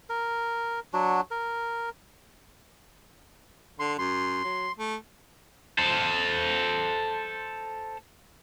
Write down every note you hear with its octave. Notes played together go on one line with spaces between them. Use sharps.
A#4
F#3 D4 F#4
A#4
D3 C6
F#2 C6
F#3
A3
A4 C5